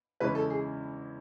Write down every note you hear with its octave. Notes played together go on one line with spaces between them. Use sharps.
E2 C#3 G#3 C#4 E4 B4
A4
G#4